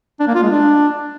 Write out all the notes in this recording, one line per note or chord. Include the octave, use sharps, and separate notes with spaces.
D4
A#3
F4
G#3
D4